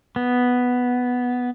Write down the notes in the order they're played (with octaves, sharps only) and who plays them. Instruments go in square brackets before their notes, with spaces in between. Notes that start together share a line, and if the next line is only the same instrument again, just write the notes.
[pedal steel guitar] B3